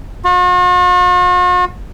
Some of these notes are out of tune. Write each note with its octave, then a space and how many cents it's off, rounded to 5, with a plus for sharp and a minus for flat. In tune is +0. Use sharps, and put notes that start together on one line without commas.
F#4 -45